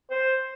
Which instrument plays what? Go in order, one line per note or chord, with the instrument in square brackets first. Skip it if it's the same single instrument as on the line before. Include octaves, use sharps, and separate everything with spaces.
[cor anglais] C5